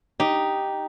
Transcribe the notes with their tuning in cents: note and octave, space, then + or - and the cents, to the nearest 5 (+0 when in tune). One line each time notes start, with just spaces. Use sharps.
D#4 +0 G4 +0